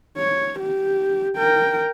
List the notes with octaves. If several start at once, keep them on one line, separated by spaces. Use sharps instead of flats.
C#5
G4
A#4 G5